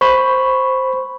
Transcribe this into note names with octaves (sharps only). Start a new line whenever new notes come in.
C5 B5 C#6